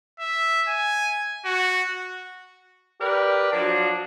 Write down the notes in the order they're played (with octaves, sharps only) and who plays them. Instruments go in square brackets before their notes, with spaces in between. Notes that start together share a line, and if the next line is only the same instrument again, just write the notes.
[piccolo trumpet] E5
G#5
F#4
[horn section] G4 A#4 B4 D5
F3 F#3 D4 F#4 A5